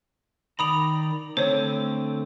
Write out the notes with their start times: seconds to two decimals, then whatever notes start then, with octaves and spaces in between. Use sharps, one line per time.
0.59 D#3 D5 A#5 B5 D#6 F7
1.37 D3 A3 C4 C5 C#5